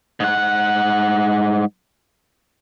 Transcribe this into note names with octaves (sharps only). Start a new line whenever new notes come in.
G#2 F#5